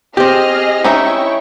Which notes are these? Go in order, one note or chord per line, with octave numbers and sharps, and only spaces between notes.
C4 G4 G#4 D#5 F6
C#4 D#4 E4 E5 G5 C#6